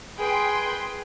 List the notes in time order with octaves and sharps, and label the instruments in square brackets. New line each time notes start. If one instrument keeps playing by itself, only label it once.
[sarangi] G#4 [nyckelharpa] B4 [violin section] G5 C6